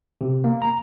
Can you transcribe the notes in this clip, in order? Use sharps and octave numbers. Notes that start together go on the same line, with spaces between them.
C3
A#3
A#5